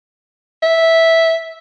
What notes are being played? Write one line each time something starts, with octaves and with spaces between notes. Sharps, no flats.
E5